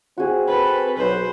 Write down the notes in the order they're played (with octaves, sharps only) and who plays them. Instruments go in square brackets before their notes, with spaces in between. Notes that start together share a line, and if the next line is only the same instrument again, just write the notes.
[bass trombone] C4 [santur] F#4 G#4
[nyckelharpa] A4 B4 [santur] B5
[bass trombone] B1 [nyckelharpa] B4 C5